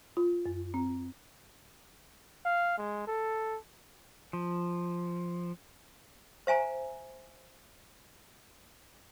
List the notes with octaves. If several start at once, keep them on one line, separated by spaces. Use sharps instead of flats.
F4
F#2
C4
F5
G#3
A4
F3
C5 E5 G#5 A#5